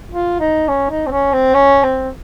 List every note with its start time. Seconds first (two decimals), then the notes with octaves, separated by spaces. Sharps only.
0.11 F4
0.40 D#4
0.68 C#4
0.90 D#4
1.06 C4
1.11 C#4
1.33 C4
1.54 C#4
1.83 C4